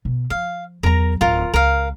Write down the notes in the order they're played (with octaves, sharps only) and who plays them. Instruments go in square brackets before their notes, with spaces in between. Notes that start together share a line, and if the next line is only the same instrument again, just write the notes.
[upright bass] B2
[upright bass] F3 [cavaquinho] F5
[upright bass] E2 F#3 [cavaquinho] A#4 A#5
[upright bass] D1 [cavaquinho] F4 A#4
[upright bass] C#2 [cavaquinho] A#4 F5